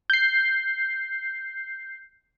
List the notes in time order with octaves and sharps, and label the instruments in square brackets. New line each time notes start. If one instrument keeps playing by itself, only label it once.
[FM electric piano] G6 C7